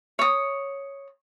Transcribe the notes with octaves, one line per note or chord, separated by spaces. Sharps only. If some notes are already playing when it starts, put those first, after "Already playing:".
C#5 D#6